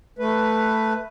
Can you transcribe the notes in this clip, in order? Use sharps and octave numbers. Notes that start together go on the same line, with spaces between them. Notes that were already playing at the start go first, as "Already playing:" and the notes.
A3 B4